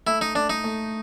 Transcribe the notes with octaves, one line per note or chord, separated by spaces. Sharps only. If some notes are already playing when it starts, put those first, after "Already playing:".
A3 E4
D#4
A3 D4
D#4
A3